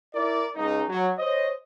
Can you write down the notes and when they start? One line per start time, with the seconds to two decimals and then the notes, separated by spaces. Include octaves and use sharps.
0.13 E4 A#4 D5
0.55 C#2 D#4
0.87 F#3
1.17 C5 C#5 D#5